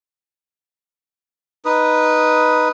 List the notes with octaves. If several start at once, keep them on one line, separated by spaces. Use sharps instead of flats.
D#4 B4 D#6